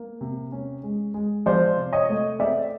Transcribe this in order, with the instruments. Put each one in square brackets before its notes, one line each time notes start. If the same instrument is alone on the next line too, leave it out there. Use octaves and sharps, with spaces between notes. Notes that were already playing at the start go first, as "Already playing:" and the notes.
Already playing: [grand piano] A#3
C3
C#4
G#3
G#3
[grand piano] F3 [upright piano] C5 D5
[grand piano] C3
[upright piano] C#5 D#5
[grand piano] A3
[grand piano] C4 [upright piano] D5 E5